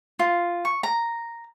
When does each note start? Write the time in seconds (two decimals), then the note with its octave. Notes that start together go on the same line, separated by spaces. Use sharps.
0.19 F4
0.65 C#6
0.83 A#5